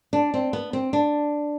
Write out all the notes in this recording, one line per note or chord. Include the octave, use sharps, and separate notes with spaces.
D4
C4
B3
C4
D4